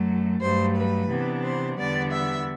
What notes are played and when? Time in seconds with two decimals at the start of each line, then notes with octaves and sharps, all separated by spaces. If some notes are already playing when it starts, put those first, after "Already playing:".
Already playing: F#2 F#3 A3
0.41 G2 F#3 A3 C5
0.76 B4
1.10 C3 E3 B3 D4
1.43 C5
1.78 E2 D3 G3 B3 D4 D5
2.12 E5